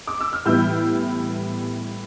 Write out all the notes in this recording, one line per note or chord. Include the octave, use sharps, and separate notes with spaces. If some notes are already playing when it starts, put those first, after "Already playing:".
D6
E6
F6
A2 E3 G3 B3 E4 E6 G6